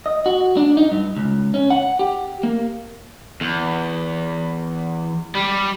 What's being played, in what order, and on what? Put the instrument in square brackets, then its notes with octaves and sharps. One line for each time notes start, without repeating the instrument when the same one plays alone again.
[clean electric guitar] D#5
F#4
D4
D#4
G2
C#2
C#4
F#5
G4
A#3
[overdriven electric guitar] E2
G3